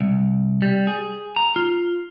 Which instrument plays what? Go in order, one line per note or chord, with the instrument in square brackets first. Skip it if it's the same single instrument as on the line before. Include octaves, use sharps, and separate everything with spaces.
[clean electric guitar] C2
G3
G#4
A#5
F4